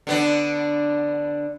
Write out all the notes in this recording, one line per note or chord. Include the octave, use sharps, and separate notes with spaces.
D3 B3 D4